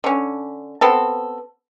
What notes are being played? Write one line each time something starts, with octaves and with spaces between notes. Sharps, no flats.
D3 C#4
B3 C4 A4